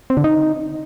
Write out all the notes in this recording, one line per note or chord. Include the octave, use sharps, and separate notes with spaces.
C4
D3
D#4